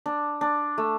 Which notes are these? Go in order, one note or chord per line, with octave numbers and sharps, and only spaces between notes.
D4
D4
A3